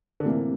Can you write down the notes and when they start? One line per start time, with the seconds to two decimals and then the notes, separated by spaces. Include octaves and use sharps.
0.20 D3
0.25 A2 C3 E3 A#3